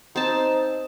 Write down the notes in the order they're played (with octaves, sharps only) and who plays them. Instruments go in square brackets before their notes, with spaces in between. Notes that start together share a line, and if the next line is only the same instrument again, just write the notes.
[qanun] C4 A5 [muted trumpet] D#4